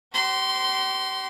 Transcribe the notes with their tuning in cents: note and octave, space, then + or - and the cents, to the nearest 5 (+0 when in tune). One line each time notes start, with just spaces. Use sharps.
G4 -45 C6 -10